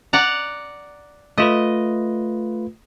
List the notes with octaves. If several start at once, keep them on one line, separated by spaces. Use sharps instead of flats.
D5 F#5 A#5
A3 F4 B4 D#5